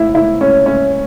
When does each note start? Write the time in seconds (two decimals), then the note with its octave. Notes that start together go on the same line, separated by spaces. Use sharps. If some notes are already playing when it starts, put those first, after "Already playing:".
Already playing: E4
0.15 E4
0.41 C#4
0.66 C#4